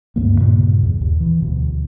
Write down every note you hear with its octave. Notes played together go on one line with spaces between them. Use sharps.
D2 G2 F3 A#3
G2 A#2 C#3
E2
D#2
E3
D2 B2